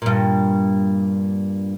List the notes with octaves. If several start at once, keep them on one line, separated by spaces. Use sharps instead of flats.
G2 A#2